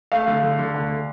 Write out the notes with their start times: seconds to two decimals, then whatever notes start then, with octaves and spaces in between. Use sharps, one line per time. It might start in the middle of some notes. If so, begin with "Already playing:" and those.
0.12 A3 F5
0.27 D3
0.42 D3
0.59 D3
0.74 D2